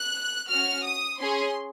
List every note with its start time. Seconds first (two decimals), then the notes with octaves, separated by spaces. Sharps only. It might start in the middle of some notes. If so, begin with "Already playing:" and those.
Already playing: F#6
0.49 C#4 F#4 F6
0.84 D#6
1.20 C#4 G#4 C6